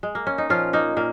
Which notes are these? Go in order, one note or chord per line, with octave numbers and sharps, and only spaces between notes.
G#3
A#3
C#4
D#4
A#2 F3 C#4 F4
A#3 D#4
A#2 A#3